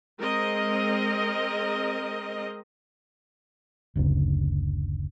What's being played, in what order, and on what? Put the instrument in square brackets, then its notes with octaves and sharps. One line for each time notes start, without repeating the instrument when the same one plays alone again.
[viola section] G#3 C4 A#4 D#5
[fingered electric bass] F#1 D2 C#3